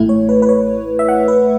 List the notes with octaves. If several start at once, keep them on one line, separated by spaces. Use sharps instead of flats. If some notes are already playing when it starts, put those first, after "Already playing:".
Already playing: A1 A2 A3 E4
C#5
B4
B4
C#5
E5
F#5
B4